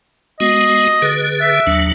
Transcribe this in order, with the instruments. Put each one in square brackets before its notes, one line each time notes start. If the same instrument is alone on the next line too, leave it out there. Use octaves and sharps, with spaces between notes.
[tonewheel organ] G#3 B3 F#4 [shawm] D#5
[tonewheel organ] D3 G#4 B4
[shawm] E5
[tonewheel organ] D#2 F#3 D4